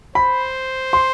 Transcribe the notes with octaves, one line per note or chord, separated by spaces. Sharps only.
C5 B5
C6